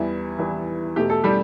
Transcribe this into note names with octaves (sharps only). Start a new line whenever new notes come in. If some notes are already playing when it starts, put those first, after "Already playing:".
Already playing: E2 E3 G3 B3 E4
E2 E3 G3 B3
E2 B2 A3 G4
A4
G3 G4